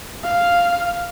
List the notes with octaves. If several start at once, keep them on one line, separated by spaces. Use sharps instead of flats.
F5